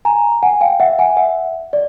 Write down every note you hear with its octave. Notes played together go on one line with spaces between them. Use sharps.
G#5 A#5
F#5 G#5
F5 G5
E5 F#5
F#5 G#5
E5 F#5
D5